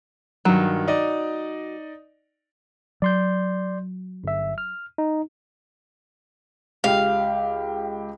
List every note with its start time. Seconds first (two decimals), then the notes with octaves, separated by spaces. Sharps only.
0.45 G2 D#3 F#3
0.88 D#4 D5 D#5
3.02 F#3 D5 C6 G6
4.24 G1 E5
4.58 F6
4.98 D#4
6.84 C#2 G4 F5